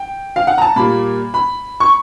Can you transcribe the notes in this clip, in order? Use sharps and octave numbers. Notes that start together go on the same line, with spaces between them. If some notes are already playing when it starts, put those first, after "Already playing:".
Already playing: G5
F5
F#5
A#5
A5
A#2 G3 A#3 B5
B5
C#6